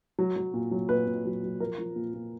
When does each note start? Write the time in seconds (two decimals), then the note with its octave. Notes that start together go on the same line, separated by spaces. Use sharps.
0.19 F#3
0.36 F#3
0.54 A#2
0.71 F#3
0.89 A#2 B4
1.07 A#2
1.25 F#3
1.43 F#3
1.60 F3 A#4
1.78 F3
1.96 A#2
2.14 A#2